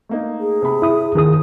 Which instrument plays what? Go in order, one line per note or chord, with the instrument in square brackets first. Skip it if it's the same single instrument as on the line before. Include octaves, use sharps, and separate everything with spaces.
[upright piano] A3 A#3 D#4
[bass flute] G#4
[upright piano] C3 B5
[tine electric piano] E4 D#6
[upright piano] D#2 F3 [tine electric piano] D#3 G#4 D#6